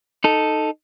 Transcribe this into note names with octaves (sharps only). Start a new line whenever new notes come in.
D#4 A4